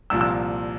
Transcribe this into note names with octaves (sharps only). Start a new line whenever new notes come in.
C2 A#2 F3 E6
E6